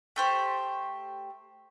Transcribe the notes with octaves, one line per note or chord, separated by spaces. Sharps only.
A3 G4 C5